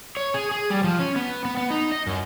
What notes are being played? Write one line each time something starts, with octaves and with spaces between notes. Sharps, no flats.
C#5
G#4
G#4
G3
F3
C#4
B3
B3
B3
D#4
D#5
F#2